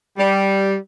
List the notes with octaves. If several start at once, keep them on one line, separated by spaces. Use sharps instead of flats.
G3